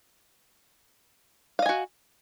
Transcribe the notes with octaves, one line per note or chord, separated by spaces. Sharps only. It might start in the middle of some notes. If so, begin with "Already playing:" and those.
F#4 D#5 F5 G#5